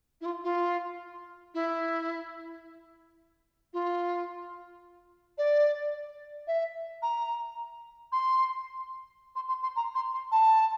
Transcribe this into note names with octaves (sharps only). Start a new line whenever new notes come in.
E4
F4
F4
E4
F4
D5
E5
A#5
C6
C6
C6
C6
A#5
C6
C6
A5